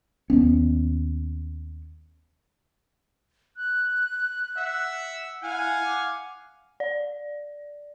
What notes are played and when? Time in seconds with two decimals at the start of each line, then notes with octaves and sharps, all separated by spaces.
0.30 D#2 B3 C#4
3.57 F#6
4.57 E5 F#5
5.42 E4 F5 F#5 G#5
5.84 D6
6.80 D5